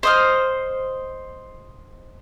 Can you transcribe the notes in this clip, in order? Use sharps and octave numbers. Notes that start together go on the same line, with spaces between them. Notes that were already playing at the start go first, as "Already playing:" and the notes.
C5 D#5 F6